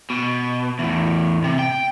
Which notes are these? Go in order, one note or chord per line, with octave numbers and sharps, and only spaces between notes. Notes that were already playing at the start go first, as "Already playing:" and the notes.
B2
E2 A2
C3
G5